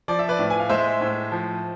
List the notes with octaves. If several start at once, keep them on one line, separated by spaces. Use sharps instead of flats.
F3 D5
E5
B4 D5
A2
G#5
F5
G#3 C5 E5
A2
F3